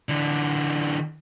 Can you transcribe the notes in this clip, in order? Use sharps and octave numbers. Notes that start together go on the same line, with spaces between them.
D3 E3